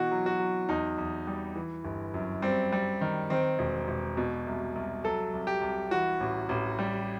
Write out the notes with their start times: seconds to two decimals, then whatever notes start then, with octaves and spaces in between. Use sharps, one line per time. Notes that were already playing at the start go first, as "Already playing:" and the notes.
Already playing: B2 E3 F#4
0.11 F#3
0.26 F#4
0.39 F#3
0.69 E2 D#4
0.98 E2
1.27 G3
1.56 E3
1.85 G1
2.14 F#2
2.42 G3 C4
2.72 G3
3.01 D#3
3.30 D#3 C4
3.59 E1
3.88 E1
4.17 B2
4.47 C2
4.76 C2
5.04 F#3 A4
5.33 C2
5.47 G4
5.61 C2
5.91 E3 F#4
6.21 A1
6.49 A1
6.79 G3